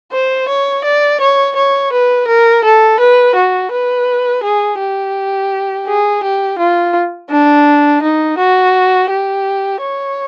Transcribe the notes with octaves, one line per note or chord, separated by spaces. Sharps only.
C5
C#5
D5
C#5
C#5
B4
A#4
A4
B4
F#4
B4
G#4
G4
G#4
G4
F4
D4
D#4
F#4
G4
C#5